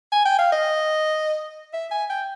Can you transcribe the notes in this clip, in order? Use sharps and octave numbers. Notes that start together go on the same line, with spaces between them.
G#5
G5
F5
D#5
E5
G#5
G5